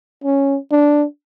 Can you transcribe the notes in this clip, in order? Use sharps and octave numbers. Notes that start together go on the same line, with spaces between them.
C#4
D4